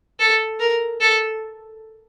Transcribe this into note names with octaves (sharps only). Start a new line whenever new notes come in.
A4
A#4
A4